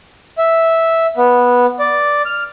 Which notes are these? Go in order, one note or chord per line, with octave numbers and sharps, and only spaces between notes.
E5
B3
D5
F6